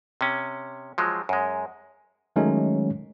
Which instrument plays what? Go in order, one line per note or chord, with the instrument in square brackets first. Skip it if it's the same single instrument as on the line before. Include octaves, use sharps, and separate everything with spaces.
[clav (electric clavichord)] C3 C#4
F3 F#3 G#3
F#2 G#3
[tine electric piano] D#3 F#3 G#3 A3 C#4 D#4